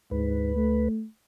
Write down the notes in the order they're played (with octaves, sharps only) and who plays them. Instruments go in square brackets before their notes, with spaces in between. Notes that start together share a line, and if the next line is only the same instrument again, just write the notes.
[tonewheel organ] D2 B4 [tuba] G#2
[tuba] A3